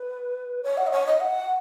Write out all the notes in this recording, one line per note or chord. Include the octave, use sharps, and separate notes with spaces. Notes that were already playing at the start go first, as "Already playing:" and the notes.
Already playing: B4
C#5
F#5
D#5
C#5
D#5
F#5